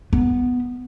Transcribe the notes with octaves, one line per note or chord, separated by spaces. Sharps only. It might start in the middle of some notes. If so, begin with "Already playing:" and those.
B3